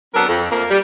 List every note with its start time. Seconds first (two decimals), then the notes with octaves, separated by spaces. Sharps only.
0.14 F#3 B3 C4 D4 A4 A#4
0.28 F2
0.50 F2 F3 A3 A#3
0.70 G3